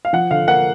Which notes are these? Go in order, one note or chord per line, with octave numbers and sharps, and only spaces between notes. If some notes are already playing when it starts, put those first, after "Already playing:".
F5
F3 F#5
D3 F5
A#3 F#5